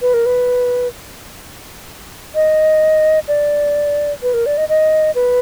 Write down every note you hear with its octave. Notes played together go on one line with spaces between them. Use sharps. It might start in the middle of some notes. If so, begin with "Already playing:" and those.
B4
A#4
B4
D#5
D5
B4
A#4
D5
D#5
D#5
B4